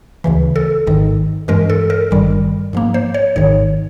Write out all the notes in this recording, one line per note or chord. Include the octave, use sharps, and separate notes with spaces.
D2 C#3 E3
A4
G#1 G#2 D#3
G2 E3 G#3 A#4
A4
A#4
G#1 G2 D#3 G3
G#2 F3 A#3
C5
C#5
G#1 G#2 D#3 C#5